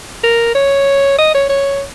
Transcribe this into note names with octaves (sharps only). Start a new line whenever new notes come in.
A#4
C#5
D#5
C#5
C#5